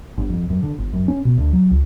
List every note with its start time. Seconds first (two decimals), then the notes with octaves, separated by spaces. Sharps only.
0.18 G1
0.29 F2
0.50 F#2
0.63 D3
0.78 G1
0.93 F#2
1.08 C#4
1.25 B2
1.38 D2
1.53 F#3
1.71 C#2